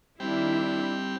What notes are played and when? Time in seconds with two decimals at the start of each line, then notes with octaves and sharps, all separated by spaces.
0.20 D#3 G3 C4 D4 E4 G5